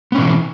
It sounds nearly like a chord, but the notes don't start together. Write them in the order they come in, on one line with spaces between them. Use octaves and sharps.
B3 C#4 B2 E3